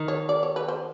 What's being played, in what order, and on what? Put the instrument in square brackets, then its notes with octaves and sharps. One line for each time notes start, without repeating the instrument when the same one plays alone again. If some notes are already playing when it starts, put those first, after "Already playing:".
Already playing: [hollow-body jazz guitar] D#3
[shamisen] C#5
D5
C#5
B4
C5